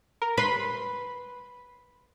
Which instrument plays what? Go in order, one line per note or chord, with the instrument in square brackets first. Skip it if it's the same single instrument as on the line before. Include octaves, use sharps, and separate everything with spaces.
[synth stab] A#4
[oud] B4 [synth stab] B5 C6 B6